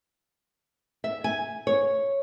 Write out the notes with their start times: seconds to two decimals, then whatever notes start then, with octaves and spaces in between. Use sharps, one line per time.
1.04 E5
1.24 G#5
1.67 C#5